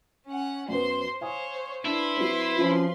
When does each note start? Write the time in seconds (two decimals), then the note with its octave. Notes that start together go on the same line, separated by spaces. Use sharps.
0.27 C#4 F#5
0.69 F#2 B3 C5 C6
1.21 C5 C#5 F5 G#5 D#6
1.85 D4 E4 B4 C6
2.17 F#3 C4
2.57 F3 C#4 F4